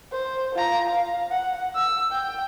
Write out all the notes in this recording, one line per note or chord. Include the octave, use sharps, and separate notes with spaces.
C5
F4 A#5
F5
F#5
E6
G5